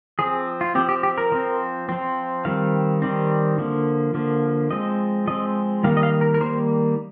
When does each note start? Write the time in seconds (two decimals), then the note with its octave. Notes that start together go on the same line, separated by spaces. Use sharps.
0.19 F3 C4 G#4
0.61 F4
0.75 F3 C4 G4
0.89 G4
1.03 G4
1.18 A#4
1.32 F3 C4
1.89 F3 C4
2.45 D#3 G3 C4 F5
3.02 D#3 G3 C4
3.58 D3 F3 A#3
4.14 D3 F3 A#3
4.71 F3 G#3 C4 D#5
5.27 F3 G#3 C4 D#5
5.83 D#3 G3 A#3 F5
5.97 D#5
6.03 F5
6.21 A#4
6.34 A#4
6.41 D#3 G3 A#3 C5